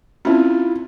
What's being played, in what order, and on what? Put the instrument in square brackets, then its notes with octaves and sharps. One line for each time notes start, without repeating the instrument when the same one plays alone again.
[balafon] C4 C#4 [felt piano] E4 F4